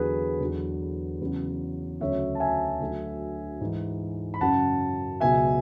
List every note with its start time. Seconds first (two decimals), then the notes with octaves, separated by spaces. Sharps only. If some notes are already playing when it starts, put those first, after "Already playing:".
Already playing: E2 D3 F#3 G#4 B4
0.40 E2 D3 F#3
1.21 E2 C#3 F#3
2.00 D2 C#3 F#3 C#5 E5
2.35 A5
2.40 E5 G#5
2.80 D2 D3 F#3
3.60 G#2 E3
4.34 B5
4.41 F#2 C#3 F#3 F#5 A5
5.20 C#2 B2 F#3 E5 G#5